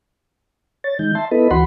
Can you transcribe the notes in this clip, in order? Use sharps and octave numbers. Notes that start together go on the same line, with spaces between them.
C#5 A6
D#3 G#3 D#4 G6
E5 A5 C6
B3 E4 A4 B4 D#5
D2 E3 F#4 F#5 B5 C6